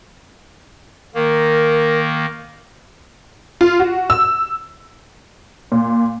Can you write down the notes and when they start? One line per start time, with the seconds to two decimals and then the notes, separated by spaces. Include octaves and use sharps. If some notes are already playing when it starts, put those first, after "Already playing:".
1.15 D#3 A#3 A#4
3.61 F4
3.80 F#4
4.10 E6
5.72 A#2